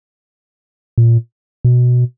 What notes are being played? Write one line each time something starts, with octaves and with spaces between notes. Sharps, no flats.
A#2
B2